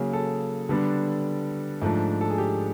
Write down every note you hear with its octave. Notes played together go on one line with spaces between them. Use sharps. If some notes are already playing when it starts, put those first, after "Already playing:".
Already playing: C#3 F#3 A#3 G#4
A4
D3 G3 B3 D4
G#2 F3 A3 D4
A4
G#4
G4